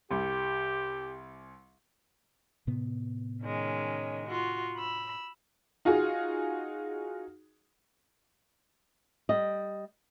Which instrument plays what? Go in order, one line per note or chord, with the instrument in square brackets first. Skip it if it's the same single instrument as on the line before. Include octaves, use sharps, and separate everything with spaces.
[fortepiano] C2 [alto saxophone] G4
[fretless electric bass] A2 C3 B3
[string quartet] D#3 G#3 C#4
F4 F#4
B5 E6
[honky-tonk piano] D#4 F4 F#4 G#4
[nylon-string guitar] G3 D#5